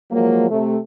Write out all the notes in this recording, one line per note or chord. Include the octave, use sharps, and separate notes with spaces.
F3 F#3 G#3 A#3
C3 A3